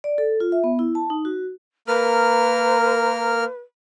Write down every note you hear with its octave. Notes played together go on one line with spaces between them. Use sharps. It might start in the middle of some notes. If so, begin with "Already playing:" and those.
D5
A4
F4
E5
B3
E4
A5
D#4
F#4
A#3 A#4 B4 F6